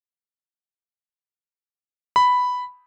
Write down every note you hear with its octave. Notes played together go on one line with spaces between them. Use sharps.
B5